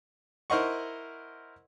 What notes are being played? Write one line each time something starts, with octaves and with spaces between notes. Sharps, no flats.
E4 A#4 C5 D#5 F#5 C#6